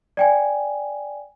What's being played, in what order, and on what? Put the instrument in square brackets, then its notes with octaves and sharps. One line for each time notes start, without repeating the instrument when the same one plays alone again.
[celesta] D5 G5 G#5